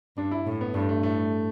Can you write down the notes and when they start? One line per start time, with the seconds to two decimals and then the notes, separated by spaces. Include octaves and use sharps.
0.17 G2 D4
0.31 E4
0.46 A2
0.61 B3
0.74 G2 A3
0.89 A3
1.03 A2 A3